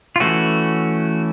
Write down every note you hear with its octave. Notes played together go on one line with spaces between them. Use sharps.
F4
E3 A3 C#4 F#4